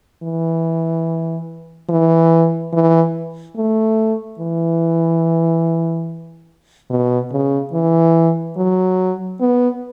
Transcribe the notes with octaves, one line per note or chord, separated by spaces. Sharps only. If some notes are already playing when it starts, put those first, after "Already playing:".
E3
E3
E3
A3
E3
B2
C#3
E3
F#3
B3